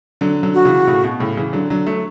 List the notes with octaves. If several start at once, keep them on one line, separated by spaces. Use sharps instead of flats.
D3 F#3
D3 F#3
F#4
C#3 E3
A2 C#3
B2
A2 C#3
C#3 E3
D3 F#3
D3 F#3
F#3 A3